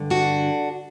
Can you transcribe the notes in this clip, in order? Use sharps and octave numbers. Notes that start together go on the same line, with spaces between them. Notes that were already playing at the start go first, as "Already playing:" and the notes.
Already playing: G2 D3
D4 F#4